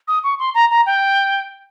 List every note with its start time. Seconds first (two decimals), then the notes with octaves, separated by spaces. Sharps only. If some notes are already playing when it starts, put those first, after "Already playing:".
0.08 D#6
0.24 C#6
0.39 C6
0.55 A#5
0.70 A#5
0.86 G5